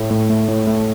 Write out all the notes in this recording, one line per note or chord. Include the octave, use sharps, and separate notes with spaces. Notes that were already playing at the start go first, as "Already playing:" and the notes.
Already playing: A2 A3
A2
A3
A2
A3